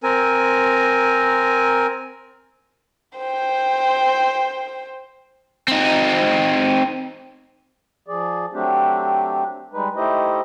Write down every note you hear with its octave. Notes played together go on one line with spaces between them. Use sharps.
C4 A#4 G#5
C5 G5
C4 D#4
F3 G#4 D5
F#3 A3 C4 D4 G4
G3 G#3 D#4 B4
A3 D#4 E4 G4 C5 D#5